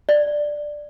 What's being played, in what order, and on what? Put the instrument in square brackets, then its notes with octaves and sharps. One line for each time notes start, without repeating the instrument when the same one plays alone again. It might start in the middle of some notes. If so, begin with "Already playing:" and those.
[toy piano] D5